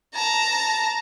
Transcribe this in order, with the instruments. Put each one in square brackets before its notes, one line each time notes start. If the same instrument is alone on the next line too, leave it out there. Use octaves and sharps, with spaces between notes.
[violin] A5 A#5